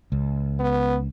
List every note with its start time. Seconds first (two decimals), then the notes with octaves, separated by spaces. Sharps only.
0.12 C#2
0.60 B3